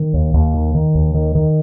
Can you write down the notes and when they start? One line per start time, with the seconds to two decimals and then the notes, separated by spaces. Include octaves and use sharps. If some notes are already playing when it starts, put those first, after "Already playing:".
Already playing: D#3
0.14 D#2
0.34 D#2
0.54 D#3
0.75 D#3
0.95 D#2
1.14 D#3
1.35 D#3